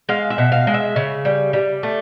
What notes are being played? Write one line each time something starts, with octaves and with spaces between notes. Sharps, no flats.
G#3 F5
E5
B2
F5
G#3
E5
C#3
G3
G3
A3